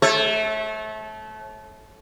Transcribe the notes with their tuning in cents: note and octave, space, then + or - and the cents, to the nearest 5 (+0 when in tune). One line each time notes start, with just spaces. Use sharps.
A3 -25 C#5 -35